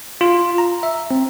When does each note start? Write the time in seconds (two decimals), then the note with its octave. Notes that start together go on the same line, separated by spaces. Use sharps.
0.21 F4
0.58 A#5
0.83 E5
1.11 C4